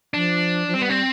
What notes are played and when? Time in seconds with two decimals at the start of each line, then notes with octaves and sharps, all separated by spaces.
0.14 F3 D4
0.67 F3
0.74 G3 C4
0.82 B3
0.89 C4